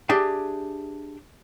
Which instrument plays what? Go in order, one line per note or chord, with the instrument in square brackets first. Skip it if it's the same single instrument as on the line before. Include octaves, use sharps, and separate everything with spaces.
[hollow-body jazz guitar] D4 G4 G#4 E5 G5